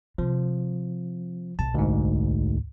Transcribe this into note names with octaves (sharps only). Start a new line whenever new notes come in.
C3 F3
B1 A#2 A5
D2 G#2